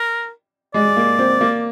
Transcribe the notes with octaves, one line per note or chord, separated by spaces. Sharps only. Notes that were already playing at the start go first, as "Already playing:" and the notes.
Already playing: A#4
G#3 D5
A#3
C4
A#3